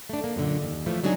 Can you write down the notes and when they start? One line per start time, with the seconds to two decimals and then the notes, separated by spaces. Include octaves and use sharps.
0.09 A3 D4
0.24 A#3
0.36 F#2 A#2 D3
0.62 D#2
0.86 A2 E3 F3 A3
1.03 C3 F#3 G#3 D4 D#4 G#4